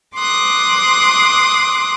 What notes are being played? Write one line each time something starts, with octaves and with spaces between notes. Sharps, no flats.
C6 D6 D#6 F#6